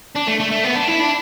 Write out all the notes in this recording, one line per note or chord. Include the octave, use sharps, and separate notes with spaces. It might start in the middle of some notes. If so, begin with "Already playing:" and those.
D4
A3
A3
A3
B3
D4
E4
D4